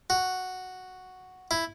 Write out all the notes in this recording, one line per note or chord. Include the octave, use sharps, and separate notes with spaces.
F#4
E4